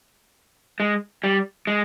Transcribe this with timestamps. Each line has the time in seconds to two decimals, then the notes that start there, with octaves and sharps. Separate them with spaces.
0.80 G#3
1.24 G3
1.67 G#3